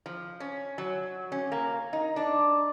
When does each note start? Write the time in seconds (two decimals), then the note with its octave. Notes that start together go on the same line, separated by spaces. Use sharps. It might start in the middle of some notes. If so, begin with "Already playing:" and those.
0.06 F3
0.40 C#4
0.78 F#3
1.32 C#4
1.52 A#3
1.93 D#4
2.16 D4